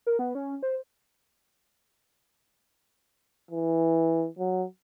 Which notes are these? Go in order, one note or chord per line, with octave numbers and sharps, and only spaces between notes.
A#4
B3
C#4
C5
E3
F#3